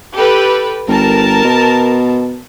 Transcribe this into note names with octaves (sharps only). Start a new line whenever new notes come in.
G4 A4 B4
G1 A#4 A5
B2